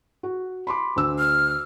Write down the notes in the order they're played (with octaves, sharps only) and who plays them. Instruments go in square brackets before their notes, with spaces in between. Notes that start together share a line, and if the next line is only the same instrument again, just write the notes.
[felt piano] F#4
B5 C6 D6
D2 E6
[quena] F6